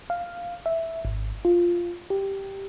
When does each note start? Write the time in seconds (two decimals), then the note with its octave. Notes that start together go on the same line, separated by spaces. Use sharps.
0.10 F5
0.66 E5
1.05 G#1
1.45 F4
2.10 G4